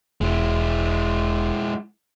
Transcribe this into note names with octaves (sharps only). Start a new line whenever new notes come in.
E1 G#3 E4